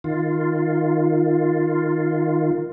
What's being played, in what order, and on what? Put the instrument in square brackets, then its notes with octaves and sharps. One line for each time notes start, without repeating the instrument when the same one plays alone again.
[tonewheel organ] D#3 F4